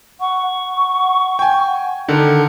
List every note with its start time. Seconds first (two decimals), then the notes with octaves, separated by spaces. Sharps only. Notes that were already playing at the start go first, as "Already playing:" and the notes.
0.20 F#5 C#6
0.53 F#5
1.39 G5 G#5
2.08 D3 D#3 A4